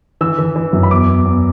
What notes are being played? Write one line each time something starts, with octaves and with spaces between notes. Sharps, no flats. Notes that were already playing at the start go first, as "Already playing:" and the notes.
E3 E6
E3
E3
F#2
B5
E2 D6
E2
E2